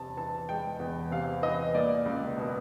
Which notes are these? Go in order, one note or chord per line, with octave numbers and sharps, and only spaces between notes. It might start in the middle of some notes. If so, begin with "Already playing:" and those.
Already playing: E2 C3 A5
E3 A5
G#3 G5
E2
C3 F5
E3 D#5
A#3 D5
C#2
B2